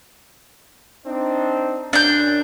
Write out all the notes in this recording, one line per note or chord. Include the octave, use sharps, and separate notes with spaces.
C4 D4 D#4
F#2 D4 G6